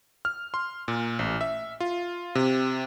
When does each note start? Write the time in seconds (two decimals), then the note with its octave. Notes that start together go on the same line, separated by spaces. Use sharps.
0.25 F6
0.54 C6
0.88 A#2
1.19 A1
1.41 E5
1.80 F4
2.35 C3